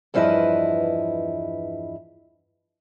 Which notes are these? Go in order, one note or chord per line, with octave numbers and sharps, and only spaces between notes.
E2 G2 F3 E4 B4 D#5